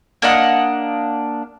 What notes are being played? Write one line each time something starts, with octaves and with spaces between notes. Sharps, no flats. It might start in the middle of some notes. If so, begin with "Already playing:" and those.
A#3 D4 D#5 F#5